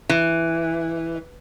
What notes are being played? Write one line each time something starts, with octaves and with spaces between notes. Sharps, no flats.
E3